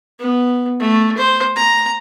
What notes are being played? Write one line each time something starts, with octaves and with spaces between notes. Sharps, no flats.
B3
A3
C5
A#5